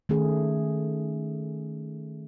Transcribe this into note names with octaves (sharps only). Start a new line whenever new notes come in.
D#3 A3 C#4 G#4